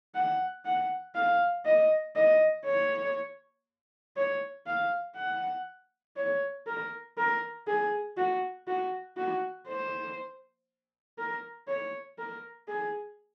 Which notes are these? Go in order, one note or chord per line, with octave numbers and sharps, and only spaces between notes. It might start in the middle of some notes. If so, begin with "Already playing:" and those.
F#5
F#5
F5
D#5
D#5
C#5
C#5
F5
F#5
C#5
A#4
A#4
G#4
F#4
F#4
F#4
C5
A#4
C#5
A#4
G#4